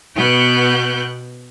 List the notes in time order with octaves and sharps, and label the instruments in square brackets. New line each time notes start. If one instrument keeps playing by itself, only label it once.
[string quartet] B2 B3 G5 F#6 G6